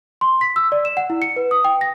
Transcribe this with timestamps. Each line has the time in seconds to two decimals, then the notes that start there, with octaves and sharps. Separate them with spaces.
0.21 C6
0.41 B6
0.56 E6
0.72 D5
0.85 E7
0.97 F#5
1.10 E4
1.22 C#7
1.36 B4
1.51 D#6
1.64 G5
1.81 A#6